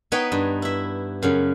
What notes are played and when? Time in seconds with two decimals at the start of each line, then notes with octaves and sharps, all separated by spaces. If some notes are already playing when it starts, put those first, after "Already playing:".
0.12 B3 D#4 B4 C#5 G5 G#5
0.32 G2
0.62 E4 E5
1.22 F#2 C#3